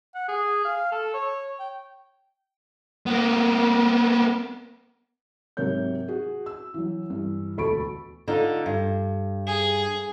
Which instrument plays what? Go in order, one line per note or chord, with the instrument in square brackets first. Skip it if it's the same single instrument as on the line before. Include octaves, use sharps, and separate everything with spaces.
[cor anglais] F#5
G#4
F5
A4
C#5
G5
[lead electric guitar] A#3 B3
[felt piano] G#2 C3 F#3 A#4 C#5 G6
F#4 G#4
E6
E3 F#3
G2 E3
E1 D2 A4 B5 C#6 D7
[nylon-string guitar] D3 D#4 F4
G2
[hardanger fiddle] G#4